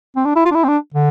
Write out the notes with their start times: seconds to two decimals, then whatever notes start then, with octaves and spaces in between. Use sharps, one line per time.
0.16 C4
0.25 D4
0.36 E4
0.46 F4
0.51 D4
0.55 E4
0.64 C4
0.68 D4
0.94 D3